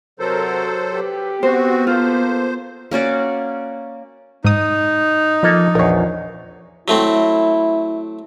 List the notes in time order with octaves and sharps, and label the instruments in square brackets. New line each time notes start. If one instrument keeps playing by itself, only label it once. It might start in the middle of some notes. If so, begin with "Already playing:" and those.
[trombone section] C3 A#4 [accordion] F#3 A4 C5
[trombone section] G4 [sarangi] B4
[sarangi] B3 [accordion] C4 F#4 [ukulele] C5
[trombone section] A#3 A4 [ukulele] F4 [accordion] C5
[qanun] A#3 C#4 F#4 D5
[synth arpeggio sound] G#2 D#6 [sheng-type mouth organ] D#4
[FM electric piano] F3 D#5 [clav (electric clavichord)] A#3 A4
[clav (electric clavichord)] A#1 E2 [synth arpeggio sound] A#4 C#5
[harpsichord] F#3 A3 C4 [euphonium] E4